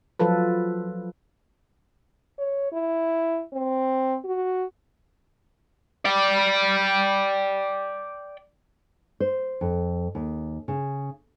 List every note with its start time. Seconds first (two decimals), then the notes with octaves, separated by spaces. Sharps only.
0.20 F3 F#3 F4 A4 B4
2.39 C#5
2.72 E4
3.53 C4
4.25 F#4
6.05 D5 G5
9.20 C5
9.61 F2
10.15 D#2
10.68 C#3